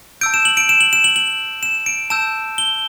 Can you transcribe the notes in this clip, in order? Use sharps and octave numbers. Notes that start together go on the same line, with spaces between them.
A5 E6 G6 D7
E7
F#7
D7
E7
F#7
E7
F#7
F#7
E7
D7
A5 E6 G6 E7
G7